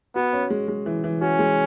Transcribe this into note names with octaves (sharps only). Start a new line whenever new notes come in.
B3 F#4
C#4
G#3
G#3
E3
E3
C#4 F#4
G#3